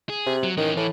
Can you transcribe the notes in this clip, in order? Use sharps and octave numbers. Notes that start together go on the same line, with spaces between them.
G#4
C3
F#3
D#3 E3 C#4
A2 E3